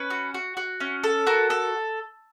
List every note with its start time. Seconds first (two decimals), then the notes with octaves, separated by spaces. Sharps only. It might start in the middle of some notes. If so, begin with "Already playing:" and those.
Already playing: C#4 B4
0.10 F#4
0.34 F#4
0.57 F#4
0.80 C#4
1.04 A4
1.26 F#4 A#4
1.50 A4